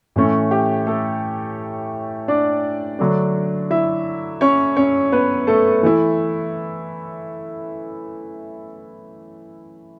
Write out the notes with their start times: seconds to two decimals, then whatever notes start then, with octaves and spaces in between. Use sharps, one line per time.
0.16 A2 E3 A3 C#4
0.51 G4
0.87 A3 A4
2.28 D4 D5
2.99 D3 F#3 A3 D4
3.71 E4 E5
4.41 C#4 C#5
4.77 C#4 C#5
5.12 B3 B4
5.47 A3 A4
5.83 E3 A3 E4